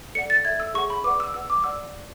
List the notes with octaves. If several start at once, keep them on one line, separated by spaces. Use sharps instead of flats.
A4 D5 F#5 C#7
A6
A4 E5 G#6
E6
G#4 C#5 F#5 C#6
B5
B4 D5 F#5 D6
E6
B4 F#5 E6
D6
D5 F#5 E6